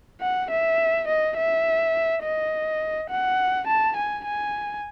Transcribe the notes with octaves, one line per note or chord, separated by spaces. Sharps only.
F#5
E5
D#5
E5
D#5
F#5
A5
G#5
G#5